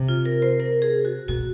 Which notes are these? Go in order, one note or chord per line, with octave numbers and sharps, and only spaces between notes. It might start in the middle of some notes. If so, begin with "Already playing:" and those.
Already playing: C3
F4
A#4
C5
A#4
G#4
F#4
A#2 F#4